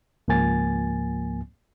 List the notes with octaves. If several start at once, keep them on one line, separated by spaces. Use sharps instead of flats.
C#2 G#2 F3 A#3 G#5 A6